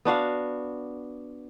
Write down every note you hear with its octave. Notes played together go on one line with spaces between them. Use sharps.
B3 D4 F#4 F5